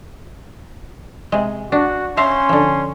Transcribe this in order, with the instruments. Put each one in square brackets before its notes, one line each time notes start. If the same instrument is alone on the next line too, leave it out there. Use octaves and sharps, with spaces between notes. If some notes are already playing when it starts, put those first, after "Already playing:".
[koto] C3 G#3
[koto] D4 [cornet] F#4
[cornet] C#4 [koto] E5 F5 A#5 [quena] C6
[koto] D3 F3